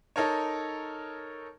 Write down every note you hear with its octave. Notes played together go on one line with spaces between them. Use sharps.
D#4 A4 A#4 C#5